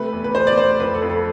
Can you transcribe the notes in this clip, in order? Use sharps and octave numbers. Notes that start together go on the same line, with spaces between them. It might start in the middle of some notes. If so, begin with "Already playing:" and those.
Already playing: C3 A3 B4
E2
B4
B2 C5
D5
A3 C5
F2 B4
A4
F2
A4